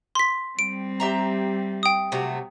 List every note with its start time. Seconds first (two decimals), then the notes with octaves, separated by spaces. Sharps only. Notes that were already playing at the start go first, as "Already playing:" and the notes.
0.15 C6 B6
0.59 G3 C4 D7
1.00 G4 E5 A#5
1.83 G5 D#6
2.12 C3 F#3 A3